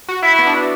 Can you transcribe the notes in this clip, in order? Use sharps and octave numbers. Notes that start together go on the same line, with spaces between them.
F#4
E4
B3
D4
E4